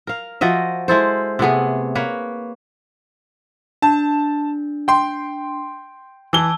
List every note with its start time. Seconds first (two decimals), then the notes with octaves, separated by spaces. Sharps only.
0.07 A#4 F5
0.41 F3 F#4 D#5 E5
0.88 G#3 E4 A4 C5
1.39 C3 A3 B3 G#4
1.95 A#3 B4 C#5
3.82 D4 A5
4.88 G5 C6
6.33 E3 A5 D6 E6 G7